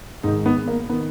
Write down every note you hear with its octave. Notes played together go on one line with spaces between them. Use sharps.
G#2 D#3 D#4
B3
A#3
D#3 B3